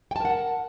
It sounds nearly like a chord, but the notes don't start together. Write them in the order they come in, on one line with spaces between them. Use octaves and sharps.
G5 A5 A#4 F#5